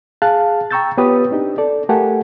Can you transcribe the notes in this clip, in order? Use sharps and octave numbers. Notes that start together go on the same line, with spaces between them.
G#4 F5 A5 F#6
G5 A#5 C#6 E6 G6 A6
B3 F4 G4 B4 C#5 D#6
C4 D4 D#4 G4
A4 D5
A3 G4 A4 A#4 F#5 G#5